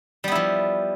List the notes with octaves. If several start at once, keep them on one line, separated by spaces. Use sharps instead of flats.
F3 G3 B3 E4